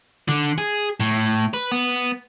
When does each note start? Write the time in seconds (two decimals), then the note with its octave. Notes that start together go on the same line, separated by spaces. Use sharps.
0.28 D3
0.58 G#4
1.00 A2
1.54 B4
1.72 B3